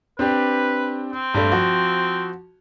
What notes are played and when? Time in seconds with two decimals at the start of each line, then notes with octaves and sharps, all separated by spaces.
0.19 C4 D4 G4 B4
1.13 C4
1.34 G2 G3 A3
1.52 F3 F#4